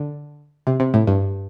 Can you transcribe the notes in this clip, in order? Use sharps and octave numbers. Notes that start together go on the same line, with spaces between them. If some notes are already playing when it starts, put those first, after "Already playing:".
Already playing: D3
C3
C3
A2
G2